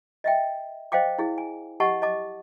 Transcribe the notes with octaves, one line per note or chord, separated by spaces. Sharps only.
D#5 E5 G5
C5 D#5 F5 G5 D6
E4 G#4
G#5
G4 D#5 F#5 A5 C#6
D#5 A5 D6